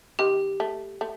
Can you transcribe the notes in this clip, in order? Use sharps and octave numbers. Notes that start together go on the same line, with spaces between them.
D#3 G4
A3
A3